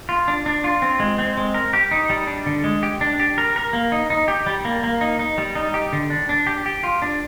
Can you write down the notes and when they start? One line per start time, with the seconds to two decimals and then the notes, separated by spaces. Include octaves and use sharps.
0.09 F4
0.28 D4
0.46 D4
0.64 F4
0.82 C4
1.00 G#3
1.18 C4
1.37 G#3
1.54 A#4
1.73 G4
1.91 D#4
2.10 G3
2.27 D4
2.46 D3
2.64 G#3
2.83 G4
3.01 D4
3.20 G4
3.38 A#4
3.56 A#4
3.73 A#3
3.92 D#4
4.10 D#4
4.28 G4
4.46 G3
4.65 A#3
4.84 A#3
5.01 D#4
5.19 D#4
5.38 G3
5.55 D#4
5.74 G4
5.93 D3
6.10 D4
6.29 D4
6.47 G4
6.66 G4
6.84 F4
7.02 D4